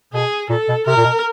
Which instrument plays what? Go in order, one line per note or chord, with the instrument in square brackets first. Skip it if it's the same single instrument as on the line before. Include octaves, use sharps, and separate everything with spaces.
[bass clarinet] B2 [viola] G#4
[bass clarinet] A#2 [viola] A4
[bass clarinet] B2
[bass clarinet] C3 [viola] A#4
[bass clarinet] A#2
B2